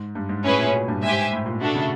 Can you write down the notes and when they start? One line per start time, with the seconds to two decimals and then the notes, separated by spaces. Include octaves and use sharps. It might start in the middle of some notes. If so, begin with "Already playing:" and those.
Already playing: G#2
0.15 G2
0.29 G#2
0.44 A2 C#4 E4 G#4 B4
0.58 A#2
0.73 B2
0.88 G2
1.03 G#2 G4 C5 E5 G#5
1.32 A2
1.46 A#2
1.61 B2 A3 D4 F#4 A4
1.75 C#3